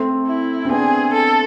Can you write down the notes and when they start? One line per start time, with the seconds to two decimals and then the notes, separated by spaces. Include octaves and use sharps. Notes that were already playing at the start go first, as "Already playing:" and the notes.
Already playing: A3 C4
0.27 E4
0.65 C4
0.69 B3 D4 G#4
1.13 A4